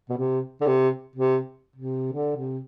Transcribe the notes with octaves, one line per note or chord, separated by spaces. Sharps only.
B2
C3
D3
C3
C3
C3
D3
C3